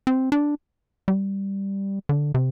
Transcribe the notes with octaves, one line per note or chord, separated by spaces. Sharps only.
C4
D4
G3
D3
C3